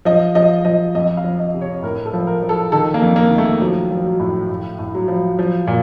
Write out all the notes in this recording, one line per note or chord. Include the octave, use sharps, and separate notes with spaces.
F3 D#5
F3 D#5
F3 D#5
F2 D#5
F5
F3
D#5
C3
C#5
A2 A#4
A4
F3
A#4
F3
A4
D#3 A4
A#3
F2
A#3
D#3
A3
F3 F#3
F3
F#3
A2
A2
A2
F#3
F3
F3
A#2